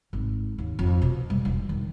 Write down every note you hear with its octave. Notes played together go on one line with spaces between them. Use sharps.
G#1
D#2
F2
B2
G3
E1
D#3